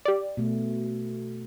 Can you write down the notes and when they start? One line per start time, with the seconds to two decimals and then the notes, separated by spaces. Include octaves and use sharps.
0.05 G4 D5
0.37 B2 A3